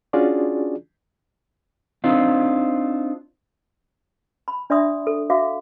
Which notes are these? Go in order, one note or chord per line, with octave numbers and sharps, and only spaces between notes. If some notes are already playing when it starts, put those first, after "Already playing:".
C#4 D4 F4 F#4 G#4 D5
C4 D4 D#4 F4
B5
D4 D5 E5 C6 D#6
A4
F#4 E5 F5 D6